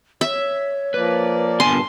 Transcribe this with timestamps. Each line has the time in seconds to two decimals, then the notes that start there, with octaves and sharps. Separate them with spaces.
0.21 C#5 E5
0.94 F3 A#3 B4 D5
1.60 G2 A#2 D3 B3 G#5 A5 C6